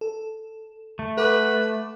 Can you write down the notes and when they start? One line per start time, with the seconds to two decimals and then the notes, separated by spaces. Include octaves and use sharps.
0.01 A4
0.99 A3
1.18 A4 B4 F#5 D6